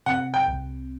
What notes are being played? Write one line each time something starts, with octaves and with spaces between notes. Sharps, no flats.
C3 F#5
G5
C2